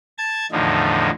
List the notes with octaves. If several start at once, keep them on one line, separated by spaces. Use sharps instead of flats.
A5 G#6
E2 A2 D3 F3 D#4